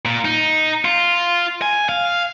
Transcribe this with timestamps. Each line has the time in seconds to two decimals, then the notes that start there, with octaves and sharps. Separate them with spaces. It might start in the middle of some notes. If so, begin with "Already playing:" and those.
0.05 A#2
0.25 D#4
0.85 F4
1.62 G#5
1.89 F5